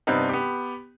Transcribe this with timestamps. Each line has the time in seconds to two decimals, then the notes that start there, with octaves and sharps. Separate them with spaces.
0.07 G2 C3 B3 C4 D4 D#4
0.29 B3 G4